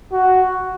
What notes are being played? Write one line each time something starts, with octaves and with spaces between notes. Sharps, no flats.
F#4